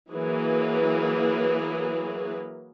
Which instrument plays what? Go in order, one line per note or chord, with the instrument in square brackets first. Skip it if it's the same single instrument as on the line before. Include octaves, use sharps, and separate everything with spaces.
[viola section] E3 F#3 A#3 G#4 B4